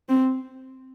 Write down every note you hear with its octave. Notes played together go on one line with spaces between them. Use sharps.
C4